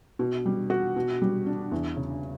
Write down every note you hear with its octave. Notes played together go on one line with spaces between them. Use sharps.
B2
G3
F#4
B2
G3
D4
E2
C#3